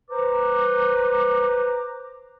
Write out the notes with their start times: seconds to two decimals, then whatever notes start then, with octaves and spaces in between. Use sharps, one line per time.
0.10 B4 C5 A#5 D6